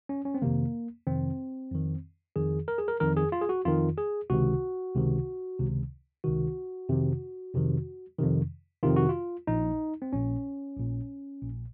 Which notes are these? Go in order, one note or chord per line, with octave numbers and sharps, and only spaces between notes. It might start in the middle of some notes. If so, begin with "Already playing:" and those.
C#4
C#4
C4
F2 C3 D#3 A#3
F2 C3 D#3 C4
F2 D#3
F2 D#3 G#4
A#4
G#4
A#4
F2 D#3 A#4
G#4
F4
G#4
F#4
F2 D#3 F4
G#4
C#2 C3 D#3 F#4
C#2 C3 D#3
C#2 C3 D#3
C#2 C3 D#3 F#4
F2 C3 D#3
F2 C3 D#3
F2 C3 D#3
F2 C3 D#3 F4
F#4
F4
A#1 A#2 D#4
C4
A#1 A#2 C#4
A#1 A#2
A#1 A#2